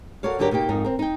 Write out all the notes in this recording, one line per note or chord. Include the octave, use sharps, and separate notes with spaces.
F#4 A4 A#4 C#5 D5 F5
G2 D3 F#3 D4 G4 A#4
B2 A#3 D#4 G4 G5
F2 G#2 D#4 A#4
C4 A#4
D#4 G5